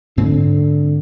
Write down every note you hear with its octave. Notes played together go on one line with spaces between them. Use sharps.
G#2 D3 C4